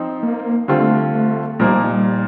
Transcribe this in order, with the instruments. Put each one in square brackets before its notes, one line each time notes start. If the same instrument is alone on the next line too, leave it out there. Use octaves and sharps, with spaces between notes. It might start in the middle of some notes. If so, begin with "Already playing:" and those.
Already playing: [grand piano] F3 C4 D#4
[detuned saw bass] A#3
[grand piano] D3 G3 C4 F4 [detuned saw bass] A3
[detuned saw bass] A3
[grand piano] A#2 F3 A#3 D#4 [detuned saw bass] G3